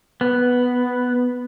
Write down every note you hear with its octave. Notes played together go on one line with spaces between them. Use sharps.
B3